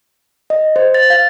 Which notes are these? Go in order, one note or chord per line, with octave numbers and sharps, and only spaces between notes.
D#5
C5
A6
F5